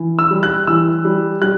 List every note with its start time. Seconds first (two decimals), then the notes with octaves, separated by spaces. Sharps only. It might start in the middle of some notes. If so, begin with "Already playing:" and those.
Already playing: E3
0.19 E6
0.31 G3
0.43 F#6
0.67 E3 E6
1.05 G3
1.41 G3 F#6